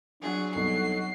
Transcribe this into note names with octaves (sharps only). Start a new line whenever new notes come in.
F#3 D4 G#4
C2 B2 D#4 A4 C7